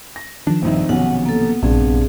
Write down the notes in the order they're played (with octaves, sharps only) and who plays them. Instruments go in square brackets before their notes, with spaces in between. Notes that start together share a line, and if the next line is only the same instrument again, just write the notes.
[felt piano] A#6
[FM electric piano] D#3 F3 [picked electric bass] D4
[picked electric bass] A#1 G2 [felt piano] C4 D#4 E5
[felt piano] B1 C3 C#4 [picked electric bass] B3 [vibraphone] F#5
[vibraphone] A#3 A4
[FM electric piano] A#1 [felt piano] G2 C3 D4 [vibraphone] C4 G#4